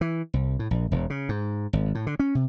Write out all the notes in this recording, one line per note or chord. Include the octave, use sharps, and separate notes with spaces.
E3
C2
A2
A#1
E1
C#3
G#2
G#1
A2
D3
C#4
C3